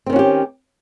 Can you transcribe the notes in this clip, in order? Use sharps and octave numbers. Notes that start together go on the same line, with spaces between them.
D#3 C4 C#4 F#4 G4